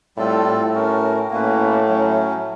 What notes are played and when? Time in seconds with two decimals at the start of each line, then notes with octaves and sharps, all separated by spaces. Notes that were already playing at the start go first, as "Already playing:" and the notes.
0.17 A2 G3 C4 F4 A4
0.46 A2
0.73 C#4 F#4 A#4
1.30 A2 A#3 C#4 F#4 B4
1.88 F#3 A3 C#4